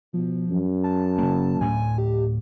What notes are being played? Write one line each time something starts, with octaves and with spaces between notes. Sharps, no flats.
B2 F3
F#2
A5
C#3 A#3
D2 A2 G#5
G4